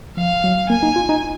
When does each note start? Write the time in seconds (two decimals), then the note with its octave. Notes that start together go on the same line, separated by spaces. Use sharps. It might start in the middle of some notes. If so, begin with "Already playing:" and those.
0.17 F3 F5
0.44 F#3
0.70 A#3 G#5
0.83 D#4
0.96 F4
1.09 D#4